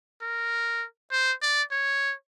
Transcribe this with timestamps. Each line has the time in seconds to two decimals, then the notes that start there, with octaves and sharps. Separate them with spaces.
0.22 A#4
1.12 C5
1.42 D5
1.71 C#5